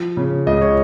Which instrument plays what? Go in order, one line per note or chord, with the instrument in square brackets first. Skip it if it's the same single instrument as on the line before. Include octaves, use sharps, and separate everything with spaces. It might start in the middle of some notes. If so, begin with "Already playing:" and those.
Already playing: [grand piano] F3
C#3
C#2 D#5
C#5